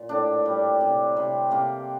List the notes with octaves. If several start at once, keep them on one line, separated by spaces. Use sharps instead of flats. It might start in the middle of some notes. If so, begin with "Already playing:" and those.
Already playing: A#2
A2 D4
G3
C3
C3
C3 A#3